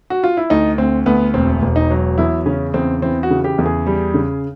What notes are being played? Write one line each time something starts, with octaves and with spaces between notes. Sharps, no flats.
F#4
F4
E4
D2 D#4
D2 C4
D2 B3
E1 C4
E1
D#4
F#3
E2 E4
C#3 C#4
E2 C4
E3 C4
F#4
C#3
G4
E2
G#4
G3
C#3